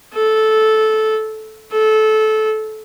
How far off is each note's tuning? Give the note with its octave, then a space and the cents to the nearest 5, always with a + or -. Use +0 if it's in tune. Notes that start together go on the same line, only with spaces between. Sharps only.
A4 -10
A4 -20